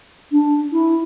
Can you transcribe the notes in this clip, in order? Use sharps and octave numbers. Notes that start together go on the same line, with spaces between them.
D4
E4